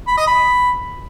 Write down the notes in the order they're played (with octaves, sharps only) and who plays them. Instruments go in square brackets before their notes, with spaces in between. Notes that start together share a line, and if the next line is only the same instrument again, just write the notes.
[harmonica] B5
D#5
B5